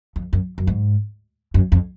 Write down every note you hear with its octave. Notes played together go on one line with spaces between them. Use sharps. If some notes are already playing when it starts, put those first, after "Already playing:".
F2
F#2
F#2
G#2
F#2
F2